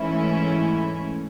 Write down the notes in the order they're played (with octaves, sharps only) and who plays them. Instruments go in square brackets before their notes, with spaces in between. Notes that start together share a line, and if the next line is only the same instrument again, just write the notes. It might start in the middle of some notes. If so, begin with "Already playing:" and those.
Already playing: [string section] G#2 E3 A3 C#4 E4